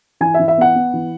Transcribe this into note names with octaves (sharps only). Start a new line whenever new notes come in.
E3 G#5
E5
E3
E5
B3 F#5
B3
E3